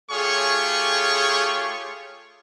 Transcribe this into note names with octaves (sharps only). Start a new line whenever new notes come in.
A3 F4 G4 G#4 C#5 C#6